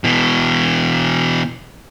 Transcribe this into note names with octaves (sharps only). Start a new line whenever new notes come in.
B2 E3